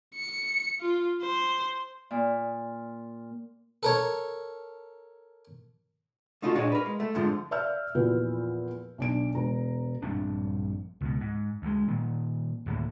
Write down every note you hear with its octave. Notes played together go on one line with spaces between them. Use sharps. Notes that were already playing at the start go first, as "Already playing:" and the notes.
C#7
F4
C5
A#2
A4 A#4 C#5
A3 D#4 F4 F#4 A4
A#2 D4 D#4 G#4 C#5
A#4 B4
G#3
A3
F2 G#2 D3 F3
D5 E5 F5 E6 F6 G6
E2 A#2 F3 E4 F#4 B4
B1 D4 D7
E1 A#5
A#1 G2 C4 D4
C#2 B2
G#2
D2 G#3
A#2 D#3
D2 A2 D#3 A#3